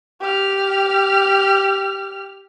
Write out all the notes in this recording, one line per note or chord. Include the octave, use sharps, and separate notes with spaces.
G4 F6